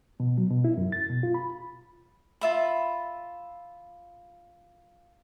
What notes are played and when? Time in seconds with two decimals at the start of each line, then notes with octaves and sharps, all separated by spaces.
0.20 B2
0.38 F#3
0.50 B2
0.65 E4
0.77 F#2
0.92 A6
1.10 B2
1.23 F4
1.34 B5
2.41 F4 E5 B5